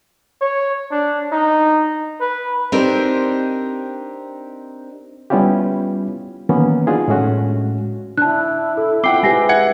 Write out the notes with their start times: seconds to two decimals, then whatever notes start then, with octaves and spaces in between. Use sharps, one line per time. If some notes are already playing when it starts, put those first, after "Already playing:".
0.41 C#5
0.91 D4
1.32 D#4
2.20 B4
2.72 C4 D4 D#4 G4 A#4
5.30 G3 B3 C#4 E4 F4 G4
6.49 D#3 E3 F#3 A#3 B3 C#4
6.87 D4 D#4 F4 F#4 G#4
7.08 A2 G#3 A3 C#4 F#4
8.18 D4 E4 A5 F#6
8.77 A4
9.04 C4 F4 F#5 G5 D6 C7 G7
9.23 G#3 G4 B4 G#5 A#6 C7
9.49 E5 F#5 G#6 C#7